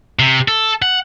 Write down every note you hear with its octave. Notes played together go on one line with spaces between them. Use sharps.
C3
A4
F#5